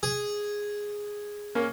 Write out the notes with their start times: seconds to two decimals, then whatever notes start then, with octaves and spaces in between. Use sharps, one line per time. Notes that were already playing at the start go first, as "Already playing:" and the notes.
0.03 G#4
1.55 A#3 C#4